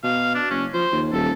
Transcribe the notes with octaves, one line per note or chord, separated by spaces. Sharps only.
B2 F5
D4
F#1 C#4
F3 C5
D#2
D#1 A4